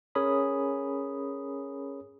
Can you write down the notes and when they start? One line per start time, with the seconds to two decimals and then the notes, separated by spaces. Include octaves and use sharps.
0.15 C#4 G#4 A#4 C#5 B5 D#6